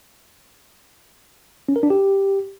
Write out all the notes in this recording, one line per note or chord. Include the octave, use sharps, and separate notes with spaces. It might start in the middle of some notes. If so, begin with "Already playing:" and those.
C#4
A#4
D4
G4